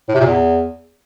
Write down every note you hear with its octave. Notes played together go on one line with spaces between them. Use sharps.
A2
C3
A#2
E2